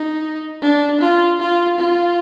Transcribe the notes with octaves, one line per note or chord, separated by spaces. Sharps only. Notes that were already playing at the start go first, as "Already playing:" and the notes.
Already playing: D#4
D4
F4
F4
F4